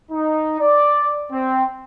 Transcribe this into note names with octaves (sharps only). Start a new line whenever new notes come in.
D#4
D5
C4